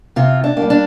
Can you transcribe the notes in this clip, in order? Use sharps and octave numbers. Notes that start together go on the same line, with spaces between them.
C3 F4
D4
A#3
G3
D4